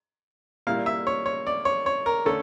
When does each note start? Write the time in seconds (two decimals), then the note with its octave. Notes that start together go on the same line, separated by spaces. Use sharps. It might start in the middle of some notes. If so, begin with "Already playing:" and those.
0.67 A#2 G3 A#3 E4 F5
0.86 E5
1.07 C#5
1.26 C#5
1.47 D5
1.65 C#5
1.86 C#5
2.06 A#4
2.25 D3 A3 C#4 A4